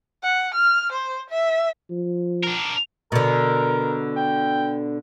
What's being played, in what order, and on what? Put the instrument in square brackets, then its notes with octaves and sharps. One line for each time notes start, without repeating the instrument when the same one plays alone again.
[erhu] F#5
F6
C5
E5
[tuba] F3
[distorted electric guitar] D4 A#4
[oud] B2 D3 [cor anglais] A#4
[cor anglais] G5